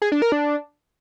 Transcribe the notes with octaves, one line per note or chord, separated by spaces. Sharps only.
G#4
D4
A#4
D4